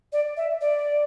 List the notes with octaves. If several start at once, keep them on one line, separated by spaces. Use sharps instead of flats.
D5
E5
D5